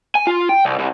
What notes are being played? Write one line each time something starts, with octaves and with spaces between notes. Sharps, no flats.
G#5
F4
G5
C2
C2